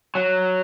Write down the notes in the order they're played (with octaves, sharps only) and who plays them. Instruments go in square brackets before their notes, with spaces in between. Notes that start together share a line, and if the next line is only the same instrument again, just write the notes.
[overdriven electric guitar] F#3